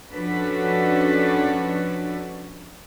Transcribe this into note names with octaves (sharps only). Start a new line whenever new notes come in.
F3 C#4 D4 F#4 A4 B4